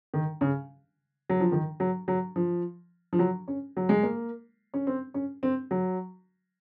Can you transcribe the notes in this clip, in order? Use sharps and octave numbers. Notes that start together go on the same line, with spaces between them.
D#3
C#3
F#3
F3
D#3
F#3
F#3
F3
F3
F#3
C#4
F#3
G#3
A#3
C#4
C4
C#4
C4
F#3